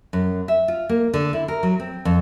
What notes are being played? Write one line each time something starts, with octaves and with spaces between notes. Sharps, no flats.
F#2
E5
F4
A#3
D3
E4
A#4
F#3
C4
F2